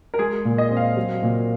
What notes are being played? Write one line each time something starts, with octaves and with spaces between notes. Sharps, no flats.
A#4
G#3 G#4
A#2
D#5
C4
F5
F#3
A#2